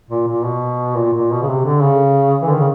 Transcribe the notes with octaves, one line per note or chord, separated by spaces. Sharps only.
A#2
A#2
B2
A#2
A#2
B2
C#3
C3
D3
C#3
E3
D3
D#3
C#3